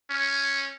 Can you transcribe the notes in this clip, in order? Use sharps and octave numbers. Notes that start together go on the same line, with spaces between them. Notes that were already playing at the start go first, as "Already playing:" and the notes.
C#4